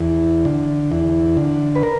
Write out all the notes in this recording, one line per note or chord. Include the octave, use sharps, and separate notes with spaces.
E2
D3
E2
D3
B4
A#4